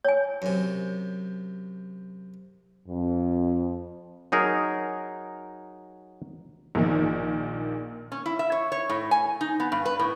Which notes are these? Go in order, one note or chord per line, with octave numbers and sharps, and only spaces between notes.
C#5 G#5
F#2 C3
F2
F#3 D#4 G#4 A#4
A#1 A#2 D#3
C#4
E4
E5
C#5
C#5
A2
G#5
D#4
B3
G2
B4
A2